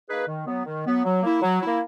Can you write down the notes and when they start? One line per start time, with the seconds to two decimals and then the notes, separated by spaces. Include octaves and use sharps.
0.09 A#3 D#4 G#4 B4
0.27 D#3
0.46 F#3 B3
0.66 D#3
0.85 F#3 B3
1.05 F#3
1.23 A#3 E4
1.42 F#3
1.61 E4
1.66 A#3